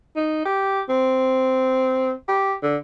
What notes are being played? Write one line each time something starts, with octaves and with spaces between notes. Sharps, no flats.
D#4
G4
C4
G4
D3